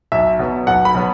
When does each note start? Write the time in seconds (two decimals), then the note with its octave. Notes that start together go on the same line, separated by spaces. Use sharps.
0.12 B1 E5
0.39 B2 F#3 B3
0.67 B1 F#5
0.85 B5
0.95 B2 F#3 B3